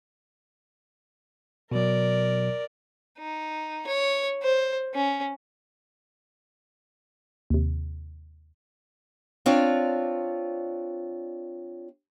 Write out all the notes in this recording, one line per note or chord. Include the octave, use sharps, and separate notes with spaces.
B2 F#3 A#4 D5
D#4
C#5
C5
C#4
D#2 C3
C4 D4 F4 C#5 D5